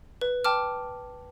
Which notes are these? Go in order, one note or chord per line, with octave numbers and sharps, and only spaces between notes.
B4
G5 A5 D6 F6